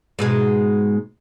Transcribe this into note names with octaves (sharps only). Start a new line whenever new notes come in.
G#2 B2 G#3